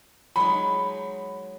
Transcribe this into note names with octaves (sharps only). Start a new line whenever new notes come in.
F#3 G#3 D#4 B5